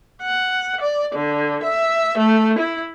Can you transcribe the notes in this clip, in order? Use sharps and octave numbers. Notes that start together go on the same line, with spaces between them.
F#5
D5
D3
E5
A3
E4